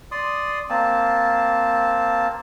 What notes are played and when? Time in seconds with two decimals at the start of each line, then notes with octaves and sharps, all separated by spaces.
0.12 D5 C6 D#6
0.70 A#3 C4 A5